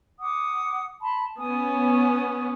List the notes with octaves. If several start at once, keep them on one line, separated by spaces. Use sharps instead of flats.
F#5 D6 D#6
A5 B5 C6
B3 C#4 G#5 D#6